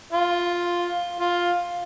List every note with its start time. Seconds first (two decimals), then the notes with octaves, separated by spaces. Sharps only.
0.13 F4
1.20 F4